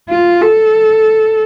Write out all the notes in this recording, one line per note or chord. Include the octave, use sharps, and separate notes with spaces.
F4
A4